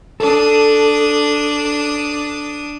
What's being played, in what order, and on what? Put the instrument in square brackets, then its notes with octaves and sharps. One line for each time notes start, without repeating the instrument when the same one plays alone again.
[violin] D4 D#6 [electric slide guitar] A4